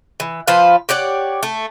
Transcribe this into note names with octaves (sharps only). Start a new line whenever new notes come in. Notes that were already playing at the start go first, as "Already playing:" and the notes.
E3
F3 B4 C5 F5
G4 C#5 D5 F#5
A3